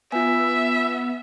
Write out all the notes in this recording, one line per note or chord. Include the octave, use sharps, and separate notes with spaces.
B3 F4 E5 G#5